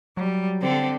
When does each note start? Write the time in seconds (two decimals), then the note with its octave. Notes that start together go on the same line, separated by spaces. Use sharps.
0.17 F#3 G3
0.62 D3 C4 A4